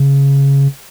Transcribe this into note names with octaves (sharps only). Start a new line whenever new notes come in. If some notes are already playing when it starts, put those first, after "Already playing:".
Already playing: C#3